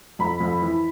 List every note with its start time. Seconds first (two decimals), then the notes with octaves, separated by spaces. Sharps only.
0.19 F2 B5
0.40 F2
0.62 E3